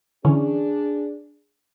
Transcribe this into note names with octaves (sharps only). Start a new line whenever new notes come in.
D3 E3 C#4 D4 G#4